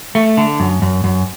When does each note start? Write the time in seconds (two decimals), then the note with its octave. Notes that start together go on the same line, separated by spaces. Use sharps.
0.15 A3
0.37 D3
0.60 F#2
0.82 F#2
1.04 F#2